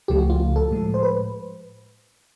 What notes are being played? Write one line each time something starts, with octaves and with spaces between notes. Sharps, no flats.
C#2 C#3 F3 A3 G4
F#4
F4
F4
A4
A2 F3 G#3
C5
B4